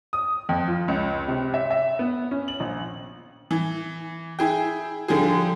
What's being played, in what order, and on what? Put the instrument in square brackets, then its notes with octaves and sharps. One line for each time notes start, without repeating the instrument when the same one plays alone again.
[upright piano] D#6
F2
F4
C#2
C3
E5
E5
B3
C#4
F#7
A#1
[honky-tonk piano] E3
E4 G#4 G5
D3 F3 G3 G4 G#4